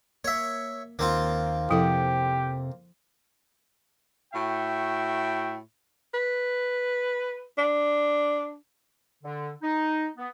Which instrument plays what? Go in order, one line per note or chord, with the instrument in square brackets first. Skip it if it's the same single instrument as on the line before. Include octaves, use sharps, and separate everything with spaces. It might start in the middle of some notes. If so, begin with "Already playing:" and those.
[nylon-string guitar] A#3 [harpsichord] C#5 E5
[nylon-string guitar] D#2 D#3 [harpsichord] A#3 C4 F4
[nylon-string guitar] F2 C3 F#5 [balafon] F3 E4 A4 [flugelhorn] G4
[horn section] A2 F#4 E5 G5
[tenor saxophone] B4
D4
[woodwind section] D3
D#4
B3